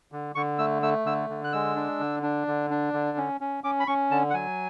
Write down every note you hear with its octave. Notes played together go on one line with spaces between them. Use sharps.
D3
D3 C#6
A3 E6
A3 E6
D3 E6
D3
F#6
G#3 E6
D4
D3
D4
D3
D4
D3
C#4
C#4
C#4 D6
B5
C#4 C#6
D3 A5
F#5
F#3 G#5